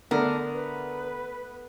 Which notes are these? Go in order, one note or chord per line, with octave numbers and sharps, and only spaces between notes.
D3 A3 B3 D4 A#4
B4